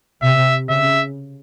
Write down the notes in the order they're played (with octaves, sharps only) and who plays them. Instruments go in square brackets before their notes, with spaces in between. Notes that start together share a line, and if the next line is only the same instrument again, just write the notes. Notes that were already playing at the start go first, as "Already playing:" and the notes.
[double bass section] C3 [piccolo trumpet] E5
[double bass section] C#3 [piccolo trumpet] E5